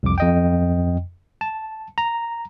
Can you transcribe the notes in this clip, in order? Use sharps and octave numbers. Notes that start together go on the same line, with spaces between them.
C2 F2 D6
F2 D#5 G5
A5
A#5